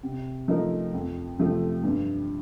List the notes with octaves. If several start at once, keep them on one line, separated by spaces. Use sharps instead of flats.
C3
F3 A3 D#4 A#4
F2
C3 F3 A3
G2